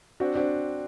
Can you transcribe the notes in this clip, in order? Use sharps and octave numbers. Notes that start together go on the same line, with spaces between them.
C4 D4 F#4
C4 D4 F#4